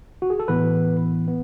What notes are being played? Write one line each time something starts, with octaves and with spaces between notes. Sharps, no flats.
F#4
G#4
A4
A2 E3 B3 B4
B3